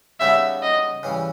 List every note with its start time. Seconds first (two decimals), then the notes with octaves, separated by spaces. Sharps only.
0.20 C#3 G3 B3 D#4 E5
0.63 D#5
1.03 C#3 E3 G3